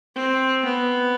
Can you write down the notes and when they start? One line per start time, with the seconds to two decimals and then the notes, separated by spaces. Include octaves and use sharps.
0.15 C4
0.65 B3